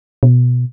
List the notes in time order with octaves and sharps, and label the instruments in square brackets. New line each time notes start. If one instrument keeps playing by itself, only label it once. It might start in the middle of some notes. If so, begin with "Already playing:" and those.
[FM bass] B2